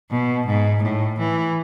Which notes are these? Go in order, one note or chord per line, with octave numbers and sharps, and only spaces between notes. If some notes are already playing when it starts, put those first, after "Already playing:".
B2
G#2
A2
E3